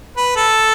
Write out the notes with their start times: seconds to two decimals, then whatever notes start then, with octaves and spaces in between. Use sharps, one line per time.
0.17 B4
0.37 A4